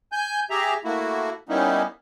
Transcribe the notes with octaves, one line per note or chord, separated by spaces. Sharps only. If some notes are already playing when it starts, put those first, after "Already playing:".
G#5 G6
G4 G#4 E5 A#5
A3 A#3 E4 F#4
G3 A#3 B3 C#4 D#4 E4